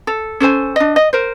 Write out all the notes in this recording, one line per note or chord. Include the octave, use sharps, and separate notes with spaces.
A4
C#4 A4 C5 G#5
D4 D#5
D#5
A#4 C5